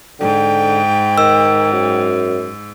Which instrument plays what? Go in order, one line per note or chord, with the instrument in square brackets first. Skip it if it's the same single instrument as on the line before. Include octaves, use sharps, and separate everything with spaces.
[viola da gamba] G#2 [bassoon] D3 [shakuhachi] G5
[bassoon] D#3 [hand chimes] E6
[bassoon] F#2